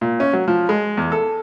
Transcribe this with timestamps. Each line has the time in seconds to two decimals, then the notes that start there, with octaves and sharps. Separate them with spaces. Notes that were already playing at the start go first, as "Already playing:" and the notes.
0.01 A#2
0.20 C#4
0.33 F#3
0.48 F3
0.69 G#3
0.97 E2
1.12 A4